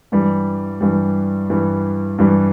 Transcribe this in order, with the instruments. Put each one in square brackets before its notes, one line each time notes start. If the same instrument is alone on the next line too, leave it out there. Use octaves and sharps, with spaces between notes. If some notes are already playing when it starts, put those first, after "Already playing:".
[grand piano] G2 E3 G3
G2 E3 G3
G2 E3 G3
G2 E3 G3